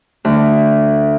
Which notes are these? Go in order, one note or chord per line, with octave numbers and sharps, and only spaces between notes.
D2